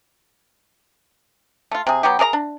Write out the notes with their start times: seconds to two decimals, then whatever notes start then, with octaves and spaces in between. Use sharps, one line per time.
1.71 A3 F4
1.87 C3 G#4
2.03 F#3 B3 F#4 G4
2.19 G#4 A#4 D5 A#5
2.33 D4